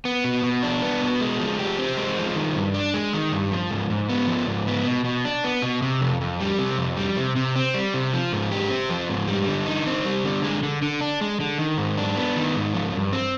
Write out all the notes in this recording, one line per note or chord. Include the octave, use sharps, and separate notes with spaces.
B3
B2
B2
D4
B3
B2
G#3
F3
G4
C4
G#3
F3
D#3
G2
D4
G#3
D#3
G2
F3
G#2
G#2
B3
F3
G#2
B3
B2
B2
D4
B3
B2
C3
F2
F2
G3
C3
F2
G3
C3
C3
C4
G3
C3
F3
G#2
G4
C4
F3
G#2
G3
D3
D#4
C4
G3
D3
G#3
D3
D3
D4
G#3
D3
D#3
G#2
D4
B3
D#3
G#2
F3
G2
C4